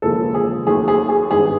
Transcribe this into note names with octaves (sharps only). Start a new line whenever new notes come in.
E1 D#2 C#3 F3 A#3 A4
G#4
D#2 D#3 F#3 A3 G#4
G#4
G#4
G#1 G2 D#3 G#3 B3 G#4